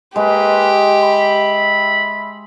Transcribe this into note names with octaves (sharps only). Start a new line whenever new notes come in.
G#3 A#3 G4 B4
E5 B5